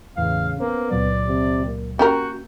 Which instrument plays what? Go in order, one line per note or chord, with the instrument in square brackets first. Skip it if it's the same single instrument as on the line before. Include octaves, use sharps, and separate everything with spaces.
[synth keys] E2 A2 E3 [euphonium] C#3 [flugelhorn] F5
[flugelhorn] A#3 [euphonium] B3 [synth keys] C#4 A#4 C5
[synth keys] C#2 A#2 F#3 [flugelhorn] D5
[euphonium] C3
A#3
[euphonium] A#3 [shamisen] C#4 G4 A#4 [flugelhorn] F#4 [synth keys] G6